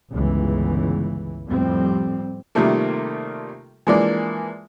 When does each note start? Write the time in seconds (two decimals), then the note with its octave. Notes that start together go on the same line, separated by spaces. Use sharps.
0.10 G1 C#2 E3
1.47 F2 A2 G3 C4
2.55 C3 D#3 F3 G3 A3 A#3
3.87 E3 F3 G#3 A#3 D4 D5